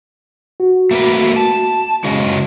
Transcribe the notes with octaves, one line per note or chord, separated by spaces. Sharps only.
F#4
A3 A#3 B4
A5
C#3 G#3 F#4